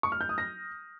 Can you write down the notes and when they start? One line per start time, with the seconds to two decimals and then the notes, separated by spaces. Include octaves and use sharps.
0.03 C#6
0.12 F6
0.21 G6
0.29 D#6
0.38 A#6